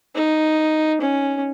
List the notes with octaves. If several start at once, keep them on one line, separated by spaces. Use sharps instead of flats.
D#4
C#4